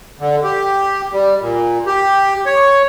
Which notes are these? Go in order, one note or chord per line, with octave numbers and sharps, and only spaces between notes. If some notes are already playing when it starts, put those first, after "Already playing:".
D3
G4
G3
A#2
G4
C#5